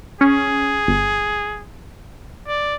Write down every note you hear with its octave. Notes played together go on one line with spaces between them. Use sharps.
C#4 G#4
G1
D5